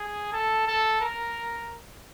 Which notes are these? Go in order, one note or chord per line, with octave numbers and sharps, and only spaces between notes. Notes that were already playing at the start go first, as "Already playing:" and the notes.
Already playing: G#4
A4
A4
A#4